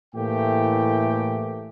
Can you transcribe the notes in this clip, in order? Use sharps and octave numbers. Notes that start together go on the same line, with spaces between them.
A2 E3 A3 A#3 G4 G5